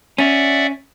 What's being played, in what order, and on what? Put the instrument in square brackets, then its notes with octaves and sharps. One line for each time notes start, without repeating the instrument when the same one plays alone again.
[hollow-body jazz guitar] C#4 [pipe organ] D5 E5 F#5